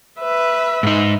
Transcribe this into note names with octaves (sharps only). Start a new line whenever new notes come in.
B4 E5
G#2 D#4